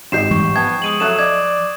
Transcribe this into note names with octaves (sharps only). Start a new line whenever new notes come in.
G#1 G4 D#5 G6 C7 E7
G#2 E3 G3 C#6
F3 B3 G5 A5 G#6
G#3 D#6 D#7 F#7
F#3 A4 E5 F#6 E7
D5 D#5 G#6